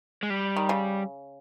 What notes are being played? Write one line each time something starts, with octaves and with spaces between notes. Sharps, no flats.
G#3
G3
D#3
C#3